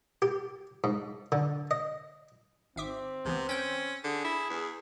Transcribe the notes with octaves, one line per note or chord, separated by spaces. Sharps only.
G4
G#2
D3
D#5
G#1 C4 E5 D6
C#2 C3 E3 B3
C#4 G5 G6
D3 G#4
E4
E2